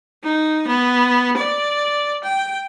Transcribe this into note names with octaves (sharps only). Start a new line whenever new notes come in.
D#4
B3
D5
G5